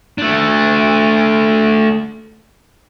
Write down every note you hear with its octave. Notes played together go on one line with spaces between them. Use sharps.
A3 D4